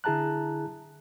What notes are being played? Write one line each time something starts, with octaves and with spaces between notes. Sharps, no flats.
D3 E4 G#4 A5 A#5 F#6